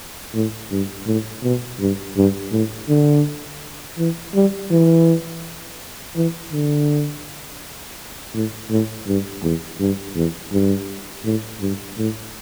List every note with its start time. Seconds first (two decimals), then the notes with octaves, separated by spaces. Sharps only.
0.34 A2
0.71 G2
1.06 A2
1.43 B2
1.80 G2
2.16 G2
2.52 A2
2.89 D3
3.98 E3
4.34 G3
4.71 E3
6.16 E3
6.52 D3
8.34 A2
8.70 A2
9.07 G2
9.42 E2
9.79 G2
10.15 E2
10.52 G2
11.25 A2
11.60 G2
11.97 A2